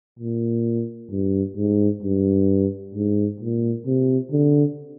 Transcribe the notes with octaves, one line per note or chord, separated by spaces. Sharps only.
A#2
G2
G#2
G2
G#2
A#2
C3
D3